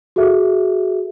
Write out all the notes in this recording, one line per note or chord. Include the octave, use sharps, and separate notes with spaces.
F#4 G#4 A4 E5